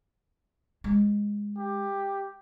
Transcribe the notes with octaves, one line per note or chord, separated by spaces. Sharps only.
G#3
G4